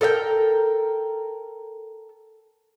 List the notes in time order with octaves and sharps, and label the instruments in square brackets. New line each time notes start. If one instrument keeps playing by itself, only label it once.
[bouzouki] A4 A#4 E5 G5